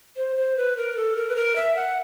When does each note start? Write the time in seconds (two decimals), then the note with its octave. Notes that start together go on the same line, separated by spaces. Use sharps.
0.17 C5
0.36 C5
0.57 B4
0.77 A#4
0.96 A4
1.17 A#4
1.29 B4
1.36 A#4
1.56 E5
1.76 F#5